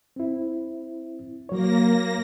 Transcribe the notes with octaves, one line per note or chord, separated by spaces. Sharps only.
C4 E4
F#3 A#3 C#5 A#6